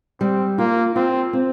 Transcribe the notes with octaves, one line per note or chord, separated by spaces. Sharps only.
G3 C4
A#3 F4
C4 F4
C4